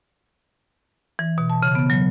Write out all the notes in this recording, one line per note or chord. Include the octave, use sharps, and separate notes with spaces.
E3
B2
A5
C#3
B3
F#3